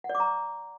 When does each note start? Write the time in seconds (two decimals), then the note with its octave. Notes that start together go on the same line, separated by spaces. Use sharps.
0.04 F#5
0.09 D5
0.15 D6
0.20 A#5